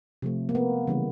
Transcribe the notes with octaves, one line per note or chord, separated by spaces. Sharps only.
C3 F3 A3
A#3
B3
C#3 E3 G3 A#3